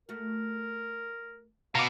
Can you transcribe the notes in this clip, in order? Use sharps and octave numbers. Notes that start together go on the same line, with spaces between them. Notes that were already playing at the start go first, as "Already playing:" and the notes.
A3 F#4 A#4
B2 F5 A#5 D6